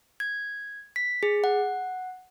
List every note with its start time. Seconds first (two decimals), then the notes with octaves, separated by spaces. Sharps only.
0.20 G#6
0.96 B6
1.23 G#4
1.44 F#5